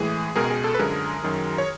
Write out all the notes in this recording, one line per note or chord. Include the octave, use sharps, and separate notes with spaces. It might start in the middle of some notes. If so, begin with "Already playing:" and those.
Already playing: A2 E3 G#3 G#4
C#2 B2 G#3 G#4 A#4
G#4
A4
B4
F#2 D3 F3 G#3 G#4 A#4
F#2 D#3 F#3
C#5